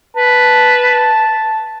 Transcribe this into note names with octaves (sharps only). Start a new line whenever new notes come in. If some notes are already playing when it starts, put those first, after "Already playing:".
B4 A5